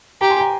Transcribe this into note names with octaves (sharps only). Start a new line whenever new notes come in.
G4 G5 A#5
G#5 C6
G5 A#5